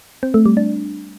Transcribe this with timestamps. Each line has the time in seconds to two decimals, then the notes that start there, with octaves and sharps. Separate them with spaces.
0.23 C4
0.34 A3
0.46 G3
0.57 D4